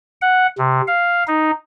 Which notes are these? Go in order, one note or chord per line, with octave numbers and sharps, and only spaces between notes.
F#5
C3
F5
D#4